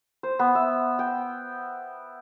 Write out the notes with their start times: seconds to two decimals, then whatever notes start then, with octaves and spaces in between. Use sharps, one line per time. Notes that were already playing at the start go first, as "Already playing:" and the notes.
0.23 C5
0.39 B3
0.55 E5
0.99 G5